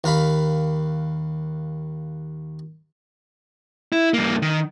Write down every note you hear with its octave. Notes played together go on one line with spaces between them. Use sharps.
D#2 A#4 F5 B5
E4
G2 A#3
D#3